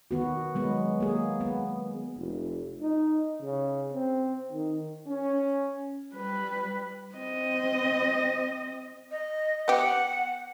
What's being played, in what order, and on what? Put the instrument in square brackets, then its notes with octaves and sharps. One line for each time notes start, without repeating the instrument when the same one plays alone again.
[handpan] D#3 B3 F#4
F#3 G#3 B3
A#3 G#4
B3
[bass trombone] F1
D#4
C#3
C4
D#3
[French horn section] C#4
[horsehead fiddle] G3 B4
C4 D#5
[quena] D#5
[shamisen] B3 G4 [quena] F#5